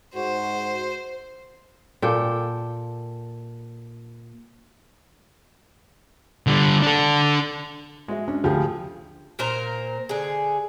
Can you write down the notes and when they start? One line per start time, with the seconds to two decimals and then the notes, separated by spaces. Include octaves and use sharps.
0.15 G#2 F#4 C5
2.02 A#2 A4 G5
6.47 D3 G3
6.82 D4 A4
8.08 G#3 F#4 E5
8.28 C#4 D4
8.44 D2 F3 G4 G#4
9.39 A#2 A#4 C5 A#5
10.09 D3 G#4